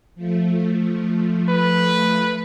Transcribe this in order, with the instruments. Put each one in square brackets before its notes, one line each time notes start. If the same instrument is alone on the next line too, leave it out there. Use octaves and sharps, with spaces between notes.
[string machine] F3 A3
[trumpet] B4